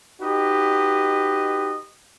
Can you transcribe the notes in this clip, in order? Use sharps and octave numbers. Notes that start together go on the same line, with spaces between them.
D#4 F#4 G4 B4 D#5